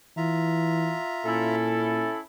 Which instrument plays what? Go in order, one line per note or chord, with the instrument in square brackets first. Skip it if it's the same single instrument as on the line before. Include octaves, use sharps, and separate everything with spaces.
[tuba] E3 [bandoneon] F4 E5 A#5
[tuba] A#2 [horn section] C#4 E4 A4